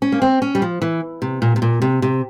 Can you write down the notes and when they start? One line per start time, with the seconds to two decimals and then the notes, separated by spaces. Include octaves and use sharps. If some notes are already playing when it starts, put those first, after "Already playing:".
0.02 C#4
0.12 A#3
0.22 C4
0.42 C#4
0.55 G3
0.62 F3
0.82 E3
1.22 C3
1.42 A#2
1.56 C3
1.62 A#2
1.82 C3
2.02 C3